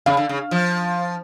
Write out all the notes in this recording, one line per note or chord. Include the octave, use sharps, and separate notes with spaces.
C#3 F5
D3
C#3
F3